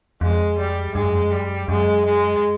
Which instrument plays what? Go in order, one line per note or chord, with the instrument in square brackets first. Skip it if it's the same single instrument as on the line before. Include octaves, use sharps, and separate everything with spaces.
[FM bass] F2 [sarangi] G#3
[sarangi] G3
[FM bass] G2 [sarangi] G#3
[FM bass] F#2
F2
F#2
[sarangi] G3
[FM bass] F#2 [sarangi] G#3
[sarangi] G#3